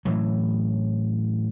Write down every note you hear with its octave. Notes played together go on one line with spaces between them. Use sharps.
A2 E3 F#3